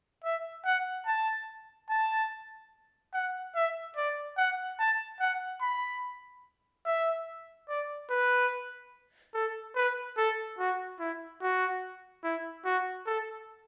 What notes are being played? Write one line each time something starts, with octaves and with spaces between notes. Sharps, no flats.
E5
F#5
A5
A5
F#5
E5
D5
F#5
A5
F#5
B5
E5
D5
B4
A4
B4
A4
F#4
E4
F#4
E4
F#4
A4